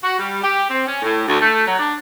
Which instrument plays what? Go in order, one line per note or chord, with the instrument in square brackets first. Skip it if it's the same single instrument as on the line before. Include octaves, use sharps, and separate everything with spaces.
[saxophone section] F#4
G3
G4
C4
C#4
A2
D2
A3
F#3
D4